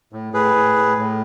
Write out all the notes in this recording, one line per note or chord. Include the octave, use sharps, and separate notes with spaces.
A2
A2 G#4 B4
A2
A2
A2